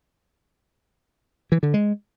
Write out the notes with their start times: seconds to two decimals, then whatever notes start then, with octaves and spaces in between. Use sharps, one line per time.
1.52 E3
1.63 D3
1.74 G#3